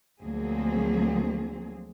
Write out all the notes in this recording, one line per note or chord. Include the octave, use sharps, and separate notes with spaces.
D2 F3 F#3 A#3 C4 G#4